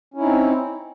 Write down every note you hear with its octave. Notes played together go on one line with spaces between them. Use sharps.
C4 C#4 D#4 E4